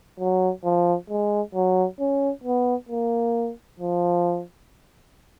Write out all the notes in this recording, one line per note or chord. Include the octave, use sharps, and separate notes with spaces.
F#3
F3
G#3
F#3
C#4
B3
A#3
F3